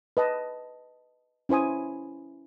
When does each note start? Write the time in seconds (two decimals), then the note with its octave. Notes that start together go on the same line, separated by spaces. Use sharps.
0.17 B4 D#5 A5
1.49 C#4 E4 C5 G#5 D#6